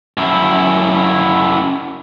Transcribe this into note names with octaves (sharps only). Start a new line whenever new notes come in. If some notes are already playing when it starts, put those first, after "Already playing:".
F#2 E4